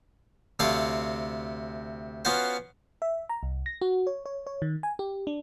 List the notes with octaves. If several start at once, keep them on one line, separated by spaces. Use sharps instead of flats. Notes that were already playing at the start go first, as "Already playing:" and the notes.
D2 C3 C4 A4 C#5 F5
B3 C#4 F4 F#4 C5
E5
A#5
C2
A#6
F#4
C#5
C#5
C#5
D#3
G#5
G4
D4